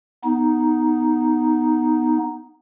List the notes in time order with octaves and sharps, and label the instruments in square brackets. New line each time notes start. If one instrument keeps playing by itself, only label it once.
[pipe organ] B3 D#4